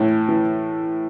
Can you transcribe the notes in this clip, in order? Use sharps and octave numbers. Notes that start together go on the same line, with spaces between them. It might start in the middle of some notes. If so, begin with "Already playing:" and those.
Already playing: A2 E3
E3